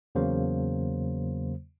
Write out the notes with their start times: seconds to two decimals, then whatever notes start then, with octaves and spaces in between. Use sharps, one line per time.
0.15 E2 C#3 F#3 A#3 C5